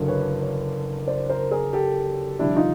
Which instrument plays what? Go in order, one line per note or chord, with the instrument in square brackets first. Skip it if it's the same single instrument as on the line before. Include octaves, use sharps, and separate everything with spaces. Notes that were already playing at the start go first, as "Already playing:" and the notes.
Already playing: [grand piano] F#1 F#2 D3
[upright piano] B4 C#5
B4 C#5
C5 D5
A#4 C5
G#4 A#4
G4 A4
[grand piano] F1 F2 D3 G3 [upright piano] D4 E4
[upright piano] D#4 F4